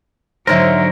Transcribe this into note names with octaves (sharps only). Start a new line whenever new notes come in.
G#2 D3 F#3 G#3 A#4 C5 C#5 E5